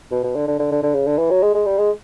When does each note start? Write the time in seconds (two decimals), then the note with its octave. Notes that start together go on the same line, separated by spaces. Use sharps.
0.11 B2
0.24 B2
0.36 D3
0.48 D3
0.59 D3
0.72 D3
0.83 D3
0.95 C#3
1.07 D3
1.18 E3
1.31 F#3
1.43 G#3
1.55 G#3
1.66 G3
1.78 G#3